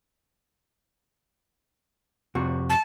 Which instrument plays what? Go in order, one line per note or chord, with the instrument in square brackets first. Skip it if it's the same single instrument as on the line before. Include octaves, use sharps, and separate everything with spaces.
[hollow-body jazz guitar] F2 C3 F#4
[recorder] A5